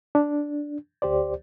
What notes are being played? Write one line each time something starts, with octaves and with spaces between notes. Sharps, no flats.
D4
D2 G4 C5 D5